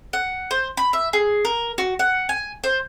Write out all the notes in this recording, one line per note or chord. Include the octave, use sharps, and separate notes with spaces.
F#5
C5
B5
E5
G#4
A#4
F#4
F#5
G#5
C5